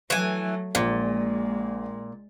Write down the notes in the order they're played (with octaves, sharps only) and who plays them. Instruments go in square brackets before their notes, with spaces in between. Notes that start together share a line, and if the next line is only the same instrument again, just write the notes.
[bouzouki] E3 G#5 [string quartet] F#3 A3
[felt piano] A#1 [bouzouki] A#2 [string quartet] G#3